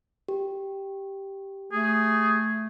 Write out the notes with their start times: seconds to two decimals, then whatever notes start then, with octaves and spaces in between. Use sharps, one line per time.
0.28 G4
1.72 A3 G#4